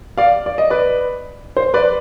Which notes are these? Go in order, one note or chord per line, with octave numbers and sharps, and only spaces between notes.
D5 F5
D5
D#5
B4 D5
C5
B4 D5